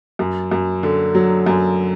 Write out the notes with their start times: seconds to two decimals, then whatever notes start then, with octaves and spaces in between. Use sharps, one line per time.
0.19 F#2
0.51 F#2
0.83 D3
1.15 F#3
1.46 F#2